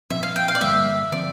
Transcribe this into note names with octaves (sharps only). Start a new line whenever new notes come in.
A#2 F3 C4 E5
F5
G5
F5
D5
G2 D3 G3 A#3 E5
D3 F3 C4 D5